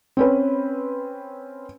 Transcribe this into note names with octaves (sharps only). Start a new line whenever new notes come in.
C4 C#4 B4